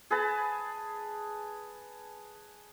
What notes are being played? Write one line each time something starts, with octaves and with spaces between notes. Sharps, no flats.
G#4 B4 A5